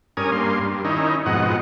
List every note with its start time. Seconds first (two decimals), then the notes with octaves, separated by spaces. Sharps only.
0.17 G2 C#4 A#4 G#5 D#6
0.32 G2 A#3 C6
0.63 G2
0.85 D#3 C#4 D#4 E4
1.26 F2 G#2 B2 D#5 F#5